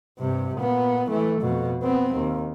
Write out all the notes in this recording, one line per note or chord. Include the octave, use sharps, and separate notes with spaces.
G2 C3
A#2 B3
E3 A3
F2 B2
B3 C4
D#2